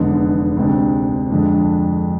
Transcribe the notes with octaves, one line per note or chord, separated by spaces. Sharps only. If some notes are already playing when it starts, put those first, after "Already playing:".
Already playing: F1 E2 D3 G#3 B3
D2 C3 G#3 D4
F2 D3 G#3 D4